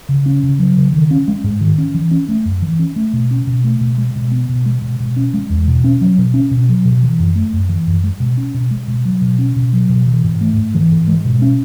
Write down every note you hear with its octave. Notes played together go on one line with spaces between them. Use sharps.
C#3
C#4
C#3
F#3
C#3
D#3
C#4
G#3
G#2
D#3
C#4
E3
C#4
A3
F#2
E3
C#4
A3
B2
C#4
B2
A3
B2
G#3
B2
B3
B2
G#3
B2
B2
C#4
G#3
E2
B2
C#4
F#3
B2
C#4
B2
F#3
B2
E3
F#2
A3
F#2
E3
F#2
G#3
B2
C#4
B2
G#3
B2
F#3
B2
C#4
B2
F#3
B2
E3
G#2
A3
G#2
E3
G#2
G#3
B2
C#4